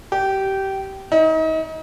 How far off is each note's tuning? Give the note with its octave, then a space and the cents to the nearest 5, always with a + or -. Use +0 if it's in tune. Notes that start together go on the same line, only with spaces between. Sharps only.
G4 -20
D#4 +35